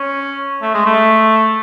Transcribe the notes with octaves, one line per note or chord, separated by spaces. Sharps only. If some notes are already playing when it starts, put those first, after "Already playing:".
Already playing: C#4
A3
G#3
A3